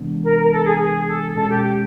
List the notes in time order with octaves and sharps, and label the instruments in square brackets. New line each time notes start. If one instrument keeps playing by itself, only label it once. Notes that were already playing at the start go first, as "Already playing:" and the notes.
Already playing: [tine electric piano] C3 E3 G#3 B3 D4
[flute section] A#4
A#4
A4
G#4
G#4
A4
[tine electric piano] B2 G#3 C#4 [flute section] A4
[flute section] G4
G4